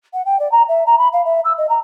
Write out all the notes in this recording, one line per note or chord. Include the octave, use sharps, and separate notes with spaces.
F#5
G5
D5
A#5
E5
A#5
B5
F5
E5
E6
D#5
A#5